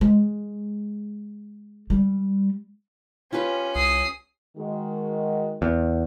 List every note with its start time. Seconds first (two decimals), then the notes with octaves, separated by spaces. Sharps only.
0.01 G#3
1.90 G3
3.33 C#4 F4 G4 B4
3.75 C2 D#6 C7
4.57 D#3 G#3 F#4
5.62 E2